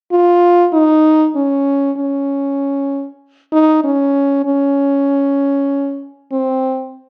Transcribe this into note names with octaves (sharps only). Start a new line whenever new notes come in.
F4
D#4
C#4
C#4
D#4
C#4
C#4
C4